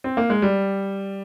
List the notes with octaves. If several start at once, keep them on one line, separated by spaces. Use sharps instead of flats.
C4
A#3
G#3
G3